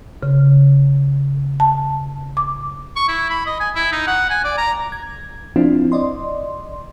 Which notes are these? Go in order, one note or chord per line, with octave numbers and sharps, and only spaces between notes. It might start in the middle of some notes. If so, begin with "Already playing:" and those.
C#3
A5
D6
C#6
E4
B5
D#5
G#5
E4
D#4
F#5
G#5
D5
A#5
G#6
F3 C4 D4 E4 F4
D5 D#5 C6